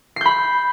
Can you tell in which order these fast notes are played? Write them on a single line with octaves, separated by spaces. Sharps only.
C7 G6 B5